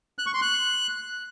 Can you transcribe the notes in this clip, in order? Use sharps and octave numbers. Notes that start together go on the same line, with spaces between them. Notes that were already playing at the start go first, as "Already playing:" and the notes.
F#6
C#6
C6
F#6